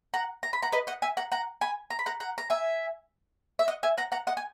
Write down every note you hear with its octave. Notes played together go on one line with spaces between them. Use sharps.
F#5 A#5
A#5
B5
F#5 A#5
B4 D#5
D#5 F#5
E5 G#5
F#5 A#5
F#5 A#5
G#5 B5
A#5
B5
F#5 A#5
F#5 A#5
A#5
E5 G#5
E5
D#5 F#5
E5 G#5
F#5 A#5
F#5 A#5
D#5 F#5
G#5